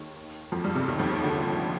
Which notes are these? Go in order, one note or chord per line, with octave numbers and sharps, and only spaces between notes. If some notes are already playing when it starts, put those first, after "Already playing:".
Already playing: D#2 D#3
F2 F3
G2 G3
C3
D#2 D#3
F2 F3
D#2 D#3
D2 D3